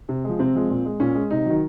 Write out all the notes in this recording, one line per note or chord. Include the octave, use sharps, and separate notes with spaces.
C3
F3 G#3
C3 C4
F3 G#3
A#2
G#3
A#2 C#4
G#3
C3 D#4
D#3 F#3